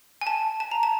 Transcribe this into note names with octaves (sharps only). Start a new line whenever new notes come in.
G#5
A5
A5
A#5
A5